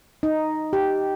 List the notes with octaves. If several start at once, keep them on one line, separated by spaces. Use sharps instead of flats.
D#4
G4